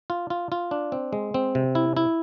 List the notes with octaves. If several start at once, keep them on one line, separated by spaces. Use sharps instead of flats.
F4
F4
F4
D4
C4
G#3
C4
C3
E4
E4